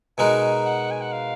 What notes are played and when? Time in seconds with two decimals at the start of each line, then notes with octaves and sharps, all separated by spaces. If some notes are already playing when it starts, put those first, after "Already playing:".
0.18 B2 G#3 D#4 F#4 A#4 G#5
0.66 F#5
0.91 G#5
1.01 F#5
1.12 F5